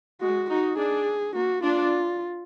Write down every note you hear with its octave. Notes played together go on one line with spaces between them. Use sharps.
G#3 F#4
D#4 F#4
D4 G#4
A#3 F#4
D4 F4